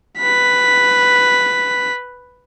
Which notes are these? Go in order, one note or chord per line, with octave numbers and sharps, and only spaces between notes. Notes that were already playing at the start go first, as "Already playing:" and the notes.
B4 B6